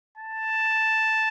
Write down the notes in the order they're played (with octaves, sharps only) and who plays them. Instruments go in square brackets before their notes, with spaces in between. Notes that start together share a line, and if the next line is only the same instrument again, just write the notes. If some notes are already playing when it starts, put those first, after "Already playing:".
[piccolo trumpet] A5